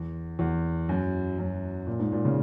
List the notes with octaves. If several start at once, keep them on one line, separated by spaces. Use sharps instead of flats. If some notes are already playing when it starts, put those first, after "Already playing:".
Already playing: E2
E2
F#2
F#2
A#2
G#2
A#2
C#3